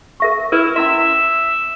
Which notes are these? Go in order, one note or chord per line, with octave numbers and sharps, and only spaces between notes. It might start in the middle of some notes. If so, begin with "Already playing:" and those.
A#4 E5 C#6
E4 A#4 B4
C#4 E4 E5 C6